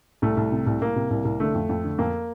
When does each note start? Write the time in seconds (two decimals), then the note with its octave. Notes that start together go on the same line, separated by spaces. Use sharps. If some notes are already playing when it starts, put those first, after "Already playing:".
0.22 C2 A3
0.37 C2
0.52 C3
0.66 C2
0.81 C2 A#3
0.96 C3
1.11 C2
1.25 C2
1.39 D3 A3
1.54 F2
1.69 F2
1.84 D3
1.98 F2 A#3